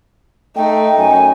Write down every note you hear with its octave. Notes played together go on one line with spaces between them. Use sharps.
A3 D#4 G5
F#2 G#5